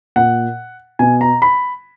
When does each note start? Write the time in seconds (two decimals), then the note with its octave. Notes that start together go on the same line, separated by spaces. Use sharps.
0.16 A#2 F#5
0.99 B2 G#5
1.21 A#5
1.42 B5